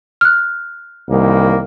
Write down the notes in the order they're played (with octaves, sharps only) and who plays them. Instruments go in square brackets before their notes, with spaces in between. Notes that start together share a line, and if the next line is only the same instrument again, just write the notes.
[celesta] F6 F#6
[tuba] C2 [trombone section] D#3 E3 A#3